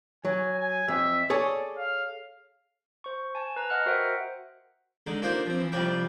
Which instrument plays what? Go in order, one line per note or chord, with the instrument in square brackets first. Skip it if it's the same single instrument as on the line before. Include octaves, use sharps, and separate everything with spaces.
[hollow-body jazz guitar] F#3 [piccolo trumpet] G#5
[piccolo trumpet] G#5
[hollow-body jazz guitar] F2 [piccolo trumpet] E5
[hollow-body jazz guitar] G#4 A4 C#5 [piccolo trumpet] D5
[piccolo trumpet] F5
[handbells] C5 C#6
G#5 A5
B4 A#5
D#5 F#5 F6 F#6
F#4 A#4 C5 E5 F#5 G5
[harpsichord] D3 G#3 D#4
A#3 D4 D#4 F4 G4 C5
F3 C4
E3
C2 F2 G3 D4 F5 G5